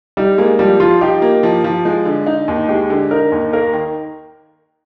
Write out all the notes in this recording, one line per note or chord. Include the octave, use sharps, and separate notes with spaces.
G3 D#4
G#3 A#3
F3 G3
F3 F4
D#4 G4
A#3
F3
F3
G#3
D3
D#4
D#2
G#3 G4
D3
D#4 A#4
D#2
A#3 A#4
D#3